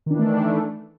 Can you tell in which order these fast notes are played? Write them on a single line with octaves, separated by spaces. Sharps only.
D#3 D4 E3 A3